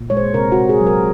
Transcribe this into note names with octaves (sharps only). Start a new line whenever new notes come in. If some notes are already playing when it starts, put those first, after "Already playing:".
Already playing: A#2
G#3 C#5
C5
C3 A#4
F#4
C3
G#4
F#3
A#4